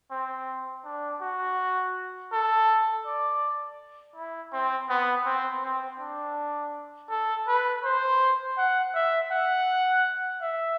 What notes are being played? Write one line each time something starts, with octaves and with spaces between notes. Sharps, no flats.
C4
D4
F#4
A4
D5
E4
C4
B3
C4
C4
D4
A4
B4
C5
F#5
E5
F#5
E5